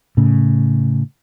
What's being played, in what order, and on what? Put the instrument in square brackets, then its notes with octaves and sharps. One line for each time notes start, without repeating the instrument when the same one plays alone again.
[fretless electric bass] A2 C#3